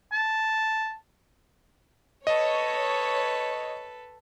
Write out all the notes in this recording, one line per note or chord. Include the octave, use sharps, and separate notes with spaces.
A5
A4 B4 C#5 D#5